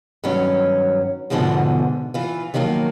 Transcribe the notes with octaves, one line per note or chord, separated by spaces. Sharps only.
G2 D#3 F#3 C#4
E2 G#2 B2 D3 E3 F3
E3 F4
D#3 F3 F#3 A3 A#3